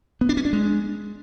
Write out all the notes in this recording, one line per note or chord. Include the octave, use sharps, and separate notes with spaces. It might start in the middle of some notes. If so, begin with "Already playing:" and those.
B3
D4
C#4
D4
G#3